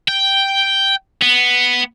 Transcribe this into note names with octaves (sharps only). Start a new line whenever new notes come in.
G5
B3